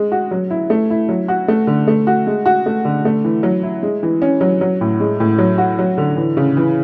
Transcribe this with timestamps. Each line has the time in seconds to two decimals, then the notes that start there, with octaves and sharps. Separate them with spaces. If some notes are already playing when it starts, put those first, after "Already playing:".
Already playing: G#3
0.12 F#4
0.31 F#3
0.50 E4
0.70 A3
0.90 E4
1.09 F#3
1.28 F#4
1.48 A3
1.67 D3
1.88 A3
2.07 F#4
2.27 G#3
2.46 F#4
2.66 A3
2.85 D3
3.05 A3
3.24 E3
3.43 F#3
3.63 E4
3.83 G#3
4.03 E3
4.22 C#4
4.41 F#3
4.61 F#3
4.81 A2
5.00 G#3
5.20 A2
5.38 F#3
5.58 F#4
5.79 F#3
5.98 D3
6.17 E3
6.37 C#3
6.57 E3